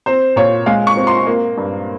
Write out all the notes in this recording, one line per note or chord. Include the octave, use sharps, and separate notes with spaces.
C4 C5
A#2 C#5
G#3 F5
C#6
C4
C6
A#3
G2